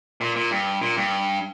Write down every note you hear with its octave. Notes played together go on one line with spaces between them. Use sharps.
A#2
A#2
G2
A#2
G2